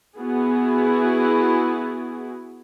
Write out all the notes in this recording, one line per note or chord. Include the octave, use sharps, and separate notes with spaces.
B3 E4 F#4 G#4